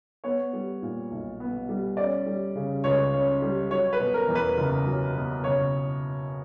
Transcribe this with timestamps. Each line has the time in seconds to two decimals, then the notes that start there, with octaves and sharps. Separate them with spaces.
0.24 B3 C#5
0.53 G3
0.82 A#2
1.11 B1
1.40 B3
1.69 G3
1.97 C#4 D5
2.26 G3
2.55 C#3
2.84 C#2 C#5
3.13 C#4
3.42 G3
3.71 F#3 C#5
3.93 B4
4.00 B2
4.14 A#4
4.28 E2
4.35 B4
4.58 F#1
4.86 F#3
5.15 B2
5.44 F#1 C#5